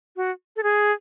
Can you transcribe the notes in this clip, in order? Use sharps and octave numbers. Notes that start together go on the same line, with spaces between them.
F#4
A4
G#4